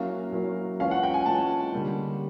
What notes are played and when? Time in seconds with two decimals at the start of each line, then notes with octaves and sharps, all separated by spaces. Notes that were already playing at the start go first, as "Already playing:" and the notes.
Already playing: F#3 A#3 C#4 E4 F5
0.32 F#3 A#3 C#4 E4
0.79 E3 G#3 C#4 F4 F5
0.91 F#5
1.03 G5
1.14 G#5
1.26 E3 G#3 C#4 F4 A5
1.73 D3 G3 A#3 C#4